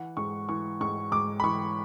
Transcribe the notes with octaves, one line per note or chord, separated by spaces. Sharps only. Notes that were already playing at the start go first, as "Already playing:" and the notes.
Already playing: E3 F#5
G#2 C#6
E3 C#6
G#2 C#6
G#2 D6
B5
E3 C#6